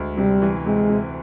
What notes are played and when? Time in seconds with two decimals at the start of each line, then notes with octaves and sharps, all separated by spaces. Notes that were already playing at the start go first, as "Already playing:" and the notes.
Already playing: D2 G#3
0.17 C3 G3
0.42 E3
0.65 C3 G#3
0.90 C3